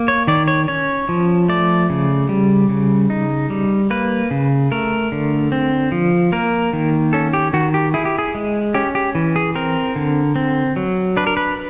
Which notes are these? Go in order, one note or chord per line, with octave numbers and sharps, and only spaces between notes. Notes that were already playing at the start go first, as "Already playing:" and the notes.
Already playing: A#3
C#5
D#3 D5
C#5
C#4 C#5
F3
A3 D5
C#3
G3
C#3
D#4
G3
A#3 B4
C#3
A3 A#4
D3
C4
F3
A#3 A#4
D#3
C#4 A4
G4
D#3 F#4
G4
E4 G#4
G4
G#4
G#3
C#4 G4
G4
E3
G#4
C4 A#4
D3
C4
F#3
D4 B4
A#4
B4